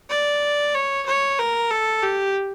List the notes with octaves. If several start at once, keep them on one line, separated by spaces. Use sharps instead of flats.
D5
C#5
C#5
A#4
A4
G4